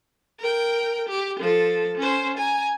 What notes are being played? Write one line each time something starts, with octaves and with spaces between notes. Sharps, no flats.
A#4 G5
G4
F3 A4
C#4 C5
G#5 A#5